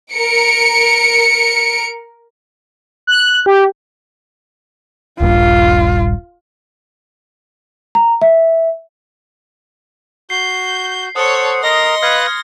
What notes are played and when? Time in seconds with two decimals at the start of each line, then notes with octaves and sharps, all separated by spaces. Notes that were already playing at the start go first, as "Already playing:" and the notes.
0.13 A#4 C#7 D7
3.07 F#6
3.46 G4
5.21 D#1 A#1 G2 F4
7.95 A#5
8.22 E5
10.30 F#4 G6 C7
11.16 A4 C5 C#5 F#5 D#6 C#7
11.63 A#4 D#5 A#5 C6 A#6
12.03 B4 F5 F6 F#6 G#6 C#7